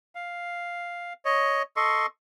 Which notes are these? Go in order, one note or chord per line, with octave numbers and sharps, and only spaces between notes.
F5
C#5 D#5
A4 D#5 C6 C#6